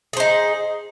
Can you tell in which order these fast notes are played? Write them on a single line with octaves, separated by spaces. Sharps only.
G#4 C5 D#4